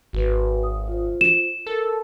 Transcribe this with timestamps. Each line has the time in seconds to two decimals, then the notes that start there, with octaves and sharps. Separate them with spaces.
0.13 G#1 F#4 B4
0.63 D#6
0.88 F4 C5
1.21 E7
1.66 A4 A#4